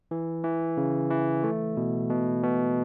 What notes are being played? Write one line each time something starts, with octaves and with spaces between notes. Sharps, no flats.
E3
E3
C#3
E3
A3
B2
B2
B2